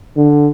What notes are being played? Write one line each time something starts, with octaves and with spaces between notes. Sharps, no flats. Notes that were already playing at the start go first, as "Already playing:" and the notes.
D3